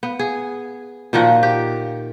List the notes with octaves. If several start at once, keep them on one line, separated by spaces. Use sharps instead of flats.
B3
G#4
A#2 D#3 F3 F#4
G4